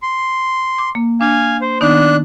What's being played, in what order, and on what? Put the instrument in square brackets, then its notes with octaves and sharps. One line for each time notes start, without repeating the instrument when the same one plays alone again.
[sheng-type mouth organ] C6
[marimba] D6
A#3
[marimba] D4 [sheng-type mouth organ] F5 G#5
[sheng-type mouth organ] C5
[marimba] D#3 B3 D#4 [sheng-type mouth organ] D4 F#6